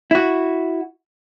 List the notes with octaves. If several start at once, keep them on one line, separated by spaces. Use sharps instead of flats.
E4 F#4